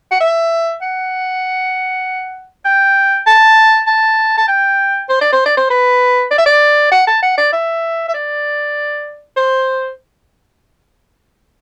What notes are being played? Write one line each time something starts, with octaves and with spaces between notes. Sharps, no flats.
F#5
E5
F#5
G5
A5
A5
A5
G5
C5
D5
C5
D5
C5
B4
D5
E5
D5
F#5
A5
F#5
D5
E5
E5
D5
C5